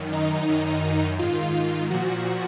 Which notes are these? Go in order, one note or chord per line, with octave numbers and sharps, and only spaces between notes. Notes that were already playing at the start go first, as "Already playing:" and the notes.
Already playing: F#2 D#3
D#4
F#2 D#3
G#2 D#3 F4
A#2 F3 F#4